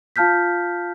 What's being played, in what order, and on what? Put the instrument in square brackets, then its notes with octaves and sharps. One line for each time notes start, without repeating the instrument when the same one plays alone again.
[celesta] F4 F5 A5 F6 G6 B6